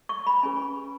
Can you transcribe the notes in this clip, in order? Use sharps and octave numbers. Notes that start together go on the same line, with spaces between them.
C#6
B5
C#4 G#4 B4 G#5